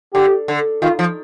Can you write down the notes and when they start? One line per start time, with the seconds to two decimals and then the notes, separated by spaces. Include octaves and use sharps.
0.14 D3 G4
0.48 D3
0.82 D#3 F4
0.99 F3